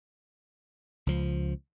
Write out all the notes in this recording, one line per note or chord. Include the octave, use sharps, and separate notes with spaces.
C#2 F3